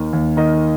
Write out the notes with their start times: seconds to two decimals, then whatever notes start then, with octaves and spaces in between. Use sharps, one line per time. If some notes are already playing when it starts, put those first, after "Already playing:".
Already playing: D#2 D#3
0.13 D#2
0.37 D#3 D#5